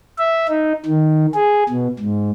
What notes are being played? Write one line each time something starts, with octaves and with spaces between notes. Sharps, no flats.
E5
D#4
D#3
G#4
B2
G#2